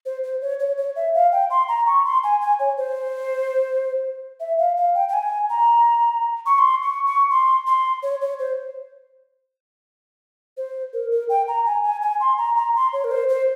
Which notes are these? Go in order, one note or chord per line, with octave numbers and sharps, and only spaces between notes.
C5
C5
C#5
C#5
C#5
E5
F5
G5
C6
A#5
C#6
C6
G#5
G#5
C#5
C5
E5
F5
F5
G5
G5
G#5
A#5
C#6
C6
C#6
C#6
C6
C6
C#5
C#5
C5
C5
A#4
A#4
G5
A#5
G#5
G#5
G#5
C6
A#5
A#5
C6
C#5
A#4
C5
C5